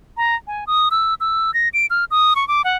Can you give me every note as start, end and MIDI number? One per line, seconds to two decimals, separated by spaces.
0.17 0.35 82
0.47 0.64 80
0.67 0.89 87
0.91 1.14 88
1.20 1.53 88
1.54 1.69 94
1.74 1.86 98
1.90 2.05 89
2.11 2.34 87
2.36 2.47 85
2.48 2.62 86
2.64 2.77 78